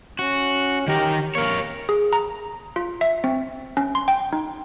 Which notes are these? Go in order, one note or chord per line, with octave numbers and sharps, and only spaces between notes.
C#4 F#4
D#3 G4 A#4
A#3 A#4 C#5
G#4
A#5
F4
E5
C4
C#4
C6
G5
D#4